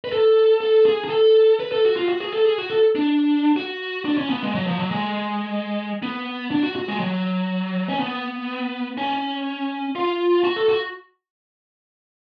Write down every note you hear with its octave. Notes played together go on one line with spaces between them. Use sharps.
B4
A4
A4
G#4
G#4
A4
B4
A4
F#4
F4
F#4
G#4
A4
G#4
F#4
A4
D4
F#4
D4
C#4
B3
G#3
F#3
F3
F#3
G#3
B3
D4
F#4
F#4
G#3
F#3
C#4
B3
C#4
F4
F#4
A4
F#4